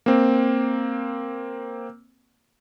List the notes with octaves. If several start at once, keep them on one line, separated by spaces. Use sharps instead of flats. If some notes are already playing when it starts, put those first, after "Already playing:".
A#3 C4